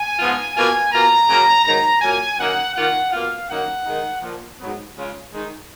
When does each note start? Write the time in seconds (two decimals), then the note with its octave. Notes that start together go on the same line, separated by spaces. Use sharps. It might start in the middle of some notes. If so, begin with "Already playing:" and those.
Already playing: G#5
0.19 G#2 F3 B3 F4
0.55 B2 A#3 F4 G#5
0.92 B2 A#3 F4 A#5
1.29 F#2 C#3 F#3 A#3
1.65 G#2 D#3 F#3 A#5
2.02 A#2 F#3 A#3 G#5
2.38 F#2 D#3 A#3 D#4 F#5
2.75 D#3 A#3 F4 F#5
3.12 B2 A#3 F4 F5
3.48 F#2 D#3 A#3 D#4 F#5
3.85 D#3 G#3 D#4
4.22 A#2 F3 A#3
4.58 G#2 F#3 B3
4.95 C#3 G#3 C#4 F4
5.32 D#3 G#3 D#4